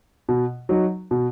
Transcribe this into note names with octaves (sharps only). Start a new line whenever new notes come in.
B2
F#3 D#4 F#4
B2